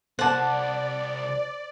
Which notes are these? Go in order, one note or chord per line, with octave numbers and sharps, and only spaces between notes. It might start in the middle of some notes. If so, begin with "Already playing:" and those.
C2 C5 D5 F#5 A5 D6